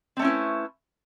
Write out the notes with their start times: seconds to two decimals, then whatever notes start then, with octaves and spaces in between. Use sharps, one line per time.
0.17 C4
0.19 A3
0.22 C#4
0.24 E4
0.27 B4